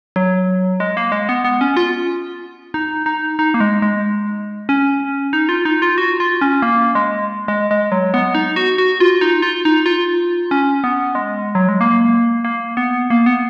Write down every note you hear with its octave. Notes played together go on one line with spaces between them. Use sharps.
F#3
G#3
A#3
G#3
B3
B3
C#4
F4
D#4
D#4
D#4
A#3
G#3
G#3
C#4
D#4
F4
D#4
F4
F#4
F4
C#4
A#3
G#3
G#3
G#3
F#3
B3
D#4
F#4
F#4
F4
D#4
F4
D#4
F4
C#4
B3
G#3
F#3
G#3
A#3
A#3
B3
A#3
B3